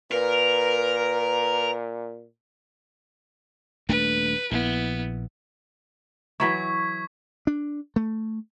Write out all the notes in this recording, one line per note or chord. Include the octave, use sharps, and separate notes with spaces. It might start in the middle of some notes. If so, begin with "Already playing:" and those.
A#2 A#4 B4
D#1 A3 D4 B4
A#1 B3 E4
E3 F#3 E4 C#6 G#6 B6
D4
A3